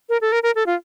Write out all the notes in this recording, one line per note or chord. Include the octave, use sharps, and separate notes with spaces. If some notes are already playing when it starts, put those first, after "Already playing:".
A#4
A4
A#4
A#4
A4
F4